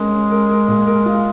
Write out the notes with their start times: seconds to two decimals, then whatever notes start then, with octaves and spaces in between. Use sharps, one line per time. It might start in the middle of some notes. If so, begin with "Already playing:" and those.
Already playing: G#3 C#4 A#4
0.12 C#4
0.31 A#4
0.49 A#4
0.68 A#2
0.87 A#4
1.06 F4